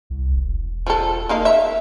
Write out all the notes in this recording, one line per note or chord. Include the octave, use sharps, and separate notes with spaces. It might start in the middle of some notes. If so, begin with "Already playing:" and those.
C2
E1
F3 A4
A#3 D#4 F5
E5